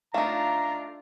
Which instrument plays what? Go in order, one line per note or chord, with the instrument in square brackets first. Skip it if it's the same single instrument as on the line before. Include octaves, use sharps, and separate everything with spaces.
[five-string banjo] A3 D#4 [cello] D4 F4 [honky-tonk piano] F5 [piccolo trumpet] A#5